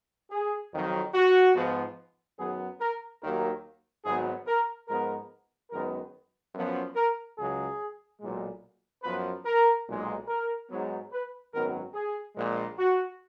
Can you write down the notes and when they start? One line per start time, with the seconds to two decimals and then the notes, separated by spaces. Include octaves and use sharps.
0.31 G#4
0.73 F2 D#3 F#3
1.14 F#4
1.55 G#2 F3 B3
2.38 F#2 D#3 F#3 B3 G#4
2.81 A#4
3.21 D#2 D#3 F#3 A#3 A#4
4.05 G#1 G#2 F#3 B3 G#4
4.47 A#4
4.88 G#2 F3 G#3 B3 A#4
5.71 F#2 D#3 G#3 B3 A#4
6.55 F#2 F3 B3
6.96 A#4
7.38 C#2 C#3 F#3 G#4
8.20 B1 A#2 G#3
9.03 F#2 F3 B3 B4
9.45 A#4
9.87 B1 A#2 G#3
10.28 A#4
10.70 G#2 F#3 B3
11.12 B4
11.53 G#1 F#2 D#3 F#3 B3 A#4
11.94 G#4
12.36 A#1 A#2 G#3
12.78 F#4